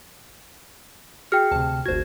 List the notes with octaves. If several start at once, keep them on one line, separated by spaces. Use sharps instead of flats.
F#4 G#4 G5 F6 C#7
D2 C3 A5
G1 D2 F#4 C5 G#6